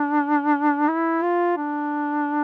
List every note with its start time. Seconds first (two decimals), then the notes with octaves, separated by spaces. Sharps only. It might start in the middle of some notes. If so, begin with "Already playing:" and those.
Already playing: D4
0.88 E4
1.23 F4
1.57 D4